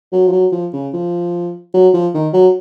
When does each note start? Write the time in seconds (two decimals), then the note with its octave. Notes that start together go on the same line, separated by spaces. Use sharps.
0.12 F#3
0.27 F3
0.32 F#3
0.52 F3
0.73 C#3
0.93 F3
1.74 F#3
1.94 F3
2.14 D#3
2.34 F#3